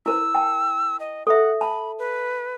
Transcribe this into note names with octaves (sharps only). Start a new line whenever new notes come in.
E4 A#4 C5 E6
G5 A5
D#5
A4 E5 F#5
A5 B5
B4